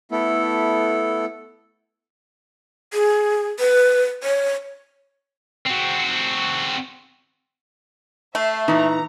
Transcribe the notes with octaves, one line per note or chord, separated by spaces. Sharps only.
A3 B3 E4 A4
G#4
B4
C#5
C4 F#4
A3 E5 C7
A#2 E3 D#4 A#5